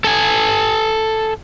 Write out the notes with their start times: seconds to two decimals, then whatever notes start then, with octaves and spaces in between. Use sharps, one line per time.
0.04 A4 G#5